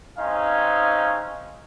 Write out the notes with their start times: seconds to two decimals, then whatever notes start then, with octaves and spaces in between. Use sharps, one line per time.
0.18 G#3 C4 C#4 D#4 F5